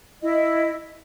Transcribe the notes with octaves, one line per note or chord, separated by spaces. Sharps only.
E4 D#5